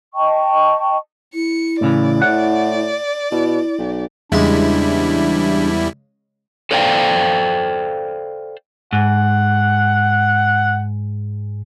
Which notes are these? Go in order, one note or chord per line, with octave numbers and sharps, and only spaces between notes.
D#5 G5 A5 C#6
E4 C#7
A2 C#3 E3 D5
A2 F#5
B2 E4
B1
E2 C#3 G3 G#3 D4 E4
A4 C5 D5 F5 G5
G#2 F#5